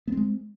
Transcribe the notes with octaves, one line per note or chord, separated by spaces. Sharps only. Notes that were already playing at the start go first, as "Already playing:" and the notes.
G#3 B3 C4